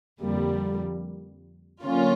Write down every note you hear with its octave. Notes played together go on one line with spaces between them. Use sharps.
F2 D3 G3 A#3
D3 F#3 A#3 C#4 F4